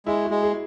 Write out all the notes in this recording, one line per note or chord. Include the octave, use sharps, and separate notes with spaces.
G#3 E4
F#4
G#3
G#4